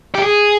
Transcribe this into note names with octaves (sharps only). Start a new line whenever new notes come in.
G4
G#4